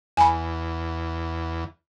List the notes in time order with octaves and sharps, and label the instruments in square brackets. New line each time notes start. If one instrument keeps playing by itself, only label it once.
[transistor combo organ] E2 [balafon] G#5 B5